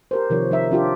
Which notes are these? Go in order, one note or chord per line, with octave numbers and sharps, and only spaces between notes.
G4 A#4 C5
C3 D#3 F3 C#5
F3 D#4 E5
F3 D4 F4 G4